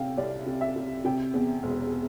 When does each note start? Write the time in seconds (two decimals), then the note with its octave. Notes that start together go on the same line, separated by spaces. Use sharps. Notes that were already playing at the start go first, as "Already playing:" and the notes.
Already playing: C3 F5 G5
0.17 C2 D5
0.46 C3
0.61 E5
0.76 C3
1.05 C3 G5
1.34 E2
1.63 E1